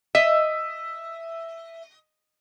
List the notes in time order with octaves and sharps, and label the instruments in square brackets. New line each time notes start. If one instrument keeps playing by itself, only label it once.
[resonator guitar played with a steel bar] D#5 [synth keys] E5